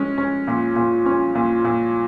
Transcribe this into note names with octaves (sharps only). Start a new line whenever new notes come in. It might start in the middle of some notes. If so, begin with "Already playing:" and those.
Already playing: G#3 C#4
C#4
A#2
A#2
C#4
A#2
A#2